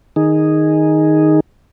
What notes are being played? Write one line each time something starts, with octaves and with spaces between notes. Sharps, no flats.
D#3 D#4 G#4